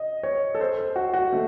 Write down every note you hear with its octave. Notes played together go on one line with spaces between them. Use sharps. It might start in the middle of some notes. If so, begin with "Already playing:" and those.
Already playing: D#5
C#5
A4
C5
A4
F#4
F#4
A3